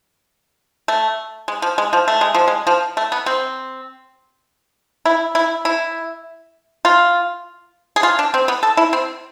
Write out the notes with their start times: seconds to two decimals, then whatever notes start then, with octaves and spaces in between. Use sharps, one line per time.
0.88 A3
1.48 G#3
1.62 F3
1.78 G#3
1.93 F3
2.08 A3
2.21 G#3
2.35 F3
2.48 G#3
2.67 F3
2.97 A3
3.12 B3
3.26 C4
5.06 E4
5.35 E4
5.65 E4
6.85 F4
7.96 G#4
8.03 F4
8.19 D4
8.34 C4
8.48 B3
8.63 A4
8.77 E4
8.93 C4